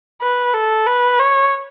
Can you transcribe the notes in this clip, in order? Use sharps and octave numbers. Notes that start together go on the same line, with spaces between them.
B4
A4
B4
C#5